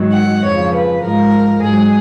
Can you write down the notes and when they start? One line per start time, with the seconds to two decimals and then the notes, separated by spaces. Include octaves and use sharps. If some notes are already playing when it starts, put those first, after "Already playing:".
Already playing: G#2 D#3 F#3
0.14 F#5
0.44 F2 C#3 F3 C#5
0.73 B4
1.02 G#2 F3 A#4
1.62 G#2 F#3 G#4